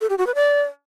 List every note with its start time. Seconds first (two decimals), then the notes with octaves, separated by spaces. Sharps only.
0.01 A4
0.10 G4
0.18 F#4
0.27 B4
0.35 D5